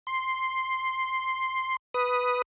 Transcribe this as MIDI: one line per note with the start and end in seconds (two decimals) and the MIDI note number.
0.07 1.76 84
1.94 2.42 71
1.94 2.42 87